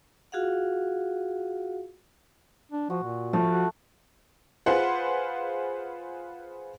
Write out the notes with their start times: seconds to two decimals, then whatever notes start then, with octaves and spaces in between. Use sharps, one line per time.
0.32 F4 F#4 G#4 F5 F#5
2.72 D4
2.90 F3 F#4
3.03 A#2
3.33 F3 A3
3.50 F#4
4.66 F4 G#4 B4 C5 F#5